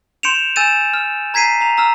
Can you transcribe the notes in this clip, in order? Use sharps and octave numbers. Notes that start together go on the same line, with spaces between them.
C6 G6 C#7 D7 E7 F7
G#5 E6 G6 A6 D#7 E7
F6
A#5 G#6 B6 C7 D#7
A#5 F7
A#5 E6 F6